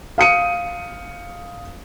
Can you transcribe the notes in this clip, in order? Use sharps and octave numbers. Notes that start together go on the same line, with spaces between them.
F5 D#6 C#7 D#7